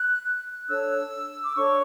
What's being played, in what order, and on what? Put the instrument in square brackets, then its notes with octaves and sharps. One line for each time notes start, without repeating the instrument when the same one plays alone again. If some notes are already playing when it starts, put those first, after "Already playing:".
Already playing: [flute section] F#6
D4 A4 C#5 E6
D6
D4 A4 C#5 C#6